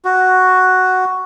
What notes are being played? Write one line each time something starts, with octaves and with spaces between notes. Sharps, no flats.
F#4